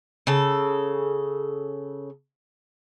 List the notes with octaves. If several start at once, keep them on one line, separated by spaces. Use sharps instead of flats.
C#3 A4